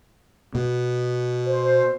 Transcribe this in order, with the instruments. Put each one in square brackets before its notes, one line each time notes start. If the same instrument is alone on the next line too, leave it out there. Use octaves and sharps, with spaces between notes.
[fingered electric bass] B2
[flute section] C5